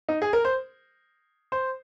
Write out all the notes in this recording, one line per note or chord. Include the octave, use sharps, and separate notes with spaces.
D#4
G#4
A#4
C5
C5